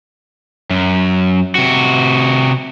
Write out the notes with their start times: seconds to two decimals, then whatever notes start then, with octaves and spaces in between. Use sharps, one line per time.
0.70 F#2
1.55 C3 F#4